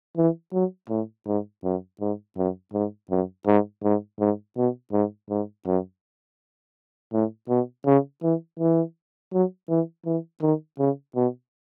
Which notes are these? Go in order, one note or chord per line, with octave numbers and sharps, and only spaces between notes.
E3
F#3
A2
G#2
F#2
G#2
F#2
G#2
F#2
G#2
G#2
G#2
B2
G#2
G#2
F#2
A2
B2
C#3
E3
E3
F#3
E3
E3
D#3
C#3
B2